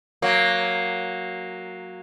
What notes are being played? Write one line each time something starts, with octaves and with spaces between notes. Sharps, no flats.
F#3 A#3